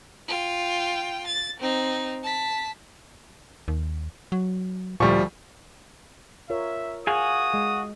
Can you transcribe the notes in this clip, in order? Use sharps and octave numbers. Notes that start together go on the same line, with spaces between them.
F4 G5
A6
C4 D#4
A5 B6
D#2
F#3
D2 A#2 F3 G3 C#6
F4 A#4 C#5 E5
F#4 G#4 F5 G#5 D#6
G#3